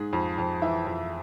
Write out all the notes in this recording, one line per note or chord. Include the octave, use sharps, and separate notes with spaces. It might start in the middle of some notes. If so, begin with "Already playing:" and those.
Already playing: G#2 G#4
F2
F2
E3 E5
F2